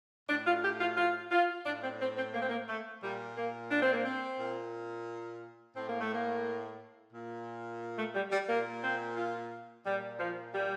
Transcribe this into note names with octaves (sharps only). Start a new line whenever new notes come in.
A2 D4
F4
G4
F4
F4
F4
A2 D4
C4
C4
C4
A#3
C4
A#3
A3
A#2 G3
A#3
D4
C4
A#3
C4
A#2
A2 C4
A#3
A3
A#3
A#2
A3
G3
G3
A#2 A#3
C4
F4
A#2 G3
F3
G3